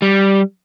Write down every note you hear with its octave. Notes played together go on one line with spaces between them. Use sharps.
G3